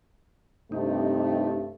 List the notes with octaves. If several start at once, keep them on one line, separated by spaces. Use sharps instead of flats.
G2 C3 A3 D#4